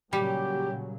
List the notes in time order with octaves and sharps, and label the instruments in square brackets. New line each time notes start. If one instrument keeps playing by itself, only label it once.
[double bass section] A#2 C#3 F#3 [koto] G3 [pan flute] G4 [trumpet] G5